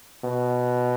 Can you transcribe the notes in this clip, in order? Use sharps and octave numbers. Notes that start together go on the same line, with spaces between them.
B2